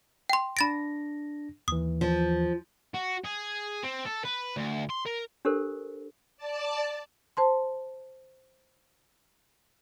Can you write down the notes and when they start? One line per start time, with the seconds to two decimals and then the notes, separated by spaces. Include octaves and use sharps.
0.29 G5 C6
0.57 D4 B5 A6 A#6 D7
1.68 D#2 E3 D#6
2.01 F3
2.94 F#4
3.25 G#4
3.83 C4
4.06 A4
4.25 B4
4.57 D2
4.90 C6
5.06 A#4
5.45 D4 G4 A4 A#4 C5
6.37 D5 A5
7.37 C5 A5 C6